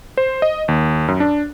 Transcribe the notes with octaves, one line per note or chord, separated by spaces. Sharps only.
C5
D#5
D#2
F#2
D4